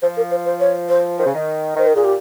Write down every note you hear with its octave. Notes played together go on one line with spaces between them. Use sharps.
F3 C5
A#4
C5
C5
C#5
C5
D#3 C5
C#3
D#3
D#3 C5
A#4
A#2 G#4
G4